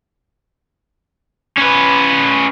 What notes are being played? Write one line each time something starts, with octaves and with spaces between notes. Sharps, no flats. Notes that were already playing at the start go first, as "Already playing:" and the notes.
C#4 B4